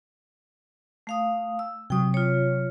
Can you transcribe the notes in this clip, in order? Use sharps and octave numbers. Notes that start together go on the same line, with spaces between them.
A3 F5 D#6
E6
C3 F#3 G5 D#6
F4 C#5